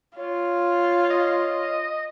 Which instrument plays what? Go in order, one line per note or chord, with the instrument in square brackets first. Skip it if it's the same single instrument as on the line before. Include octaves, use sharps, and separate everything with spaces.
[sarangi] F4 [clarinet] C#5
[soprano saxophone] D#5